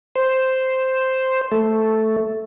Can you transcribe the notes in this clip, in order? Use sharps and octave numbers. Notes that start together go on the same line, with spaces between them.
C5
A3